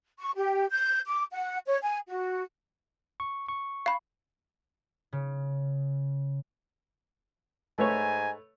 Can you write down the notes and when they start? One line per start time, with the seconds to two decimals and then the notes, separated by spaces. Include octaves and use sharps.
0.19 C#6
0.36 G4
0.71 G6
1.08 D6
1.31 F#5
1.66 C#5
1.82 G#5
2.08 F#4
3.20 C#6
3.48 C#6
3.86 F5 B5
5.12 C#3
7.78 G#2 A3 B4 C#5 G#5